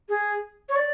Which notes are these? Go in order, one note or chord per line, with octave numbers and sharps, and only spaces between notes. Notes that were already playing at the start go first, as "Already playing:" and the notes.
G#4
C#5
D5